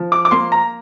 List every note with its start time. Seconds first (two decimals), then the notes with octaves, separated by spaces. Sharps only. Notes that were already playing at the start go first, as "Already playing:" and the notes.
Already playing: F3
0.12 D6
0.25 D6
0.31 A#3 C6
0.52 A#5